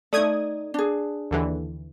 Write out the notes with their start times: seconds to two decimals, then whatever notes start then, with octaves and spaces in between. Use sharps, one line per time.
0.13 A3 D#4 D5 D#6 G#6
0.74 D4 G#4
1.31 D#2 D3 E3